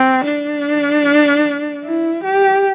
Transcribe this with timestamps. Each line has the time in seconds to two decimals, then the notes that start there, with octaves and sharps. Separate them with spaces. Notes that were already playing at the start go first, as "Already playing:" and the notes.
Already playing: C4
0.24 D4
1.85 E4
2.24 G4